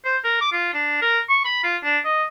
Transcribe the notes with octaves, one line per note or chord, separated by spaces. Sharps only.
C5
A#4
D6
F4
D4
A#4
C#6
B5
F4
D4
D#5